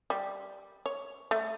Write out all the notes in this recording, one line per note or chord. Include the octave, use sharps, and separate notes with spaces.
G3
C#5
A3